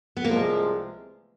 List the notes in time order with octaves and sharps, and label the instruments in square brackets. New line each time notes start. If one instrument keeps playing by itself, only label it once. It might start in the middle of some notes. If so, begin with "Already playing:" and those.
[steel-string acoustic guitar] B3
[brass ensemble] C2 C3 F3 G#3 [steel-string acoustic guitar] A#3